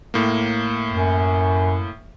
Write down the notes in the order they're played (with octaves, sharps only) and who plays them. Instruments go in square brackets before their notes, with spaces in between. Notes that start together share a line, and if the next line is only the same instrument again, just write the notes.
[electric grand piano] A2 A#3
[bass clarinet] F#2